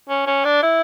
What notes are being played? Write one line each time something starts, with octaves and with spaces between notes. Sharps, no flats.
C#4
C#4
D4
E4